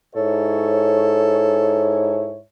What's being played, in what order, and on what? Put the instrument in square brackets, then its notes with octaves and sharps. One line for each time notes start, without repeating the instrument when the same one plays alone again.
[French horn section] G#2 E4 C#5 [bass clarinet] A4